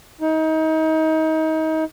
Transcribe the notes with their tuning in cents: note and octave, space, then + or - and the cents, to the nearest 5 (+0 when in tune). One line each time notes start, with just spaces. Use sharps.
D#4 +30